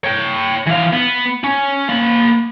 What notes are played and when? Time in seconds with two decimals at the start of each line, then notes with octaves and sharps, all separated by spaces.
0.04 C#5 G5
0.67 E3 F5
0.93 B3
1.44 C#4
1.88 A#3 B5